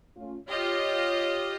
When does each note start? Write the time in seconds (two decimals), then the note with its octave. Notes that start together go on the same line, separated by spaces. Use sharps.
0.16 A3 C#4 F4
0.48 F4 G4 C#5 D#5